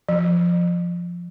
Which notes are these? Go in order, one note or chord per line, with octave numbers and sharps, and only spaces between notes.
F3